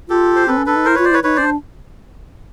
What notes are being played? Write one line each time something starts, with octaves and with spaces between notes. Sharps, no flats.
F4 G4 A4
C5
C4 A4 B4
C#4
D4 A4 B4
D#4
E4 A#4 C5
F4 B4 C#5
C5 D5
E4 B4 C#5
D#4 B4 C#5
C#4 C5 D5
D4